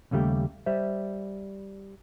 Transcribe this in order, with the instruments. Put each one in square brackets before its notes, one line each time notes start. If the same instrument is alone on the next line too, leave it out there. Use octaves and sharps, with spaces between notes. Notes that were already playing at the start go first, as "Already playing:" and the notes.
[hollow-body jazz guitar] D#2 C#3 G3 A3 G4
G3 C5 E5